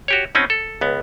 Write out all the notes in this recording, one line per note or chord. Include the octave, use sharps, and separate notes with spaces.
F#4 G4 C#5
B2 C4 C#4 D#4
A4
C#2 B3